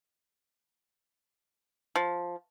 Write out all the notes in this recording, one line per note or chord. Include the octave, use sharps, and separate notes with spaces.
F3